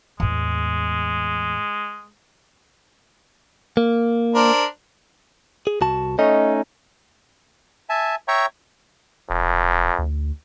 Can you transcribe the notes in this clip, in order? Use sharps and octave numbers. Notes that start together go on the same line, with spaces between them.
E2 A2 G#3
A#3
D4 A#4 C5
G#4
C2 F#4 A5
A3 C#4 D#4 D#5
E5 G#5 A5
C#5 E5 G5 A#5 C#6
D#1 F2
D2